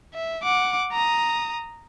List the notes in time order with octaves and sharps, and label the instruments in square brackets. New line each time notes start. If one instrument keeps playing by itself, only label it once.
[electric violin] E5
F#5 D6
A#5 D#6